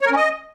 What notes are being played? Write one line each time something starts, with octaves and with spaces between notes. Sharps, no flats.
C#5
A#4
C#4
D#5